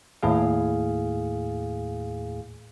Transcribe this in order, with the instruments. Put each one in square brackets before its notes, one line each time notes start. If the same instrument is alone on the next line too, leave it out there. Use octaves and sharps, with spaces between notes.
[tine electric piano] D#2 A2 G#4 F5